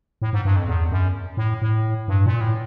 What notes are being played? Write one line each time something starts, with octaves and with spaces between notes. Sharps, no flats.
A2
G#2
G2
F2
E2
F#2
A2
A2
G2
A#2
A2